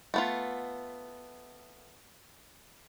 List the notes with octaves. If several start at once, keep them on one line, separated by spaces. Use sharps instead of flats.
A3 B3 F4